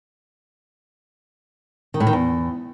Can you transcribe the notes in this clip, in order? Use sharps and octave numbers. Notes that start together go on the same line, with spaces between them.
D#3
A2
D#3
E2